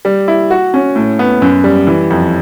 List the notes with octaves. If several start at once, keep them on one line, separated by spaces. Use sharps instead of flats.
G3
E4
F#4
C#4
A2
B3
F#2
G3
E3
F2